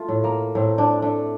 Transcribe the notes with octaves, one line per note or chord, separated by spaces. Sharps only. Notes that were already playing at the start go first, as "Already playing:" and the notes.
Already playing: A3 F4
A2
A#3
A2 C4
D4
A3 D4